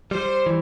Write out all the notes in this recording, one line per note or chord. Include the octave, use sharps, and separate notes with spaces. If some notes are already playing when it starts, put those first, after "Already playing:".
G3 C5
E3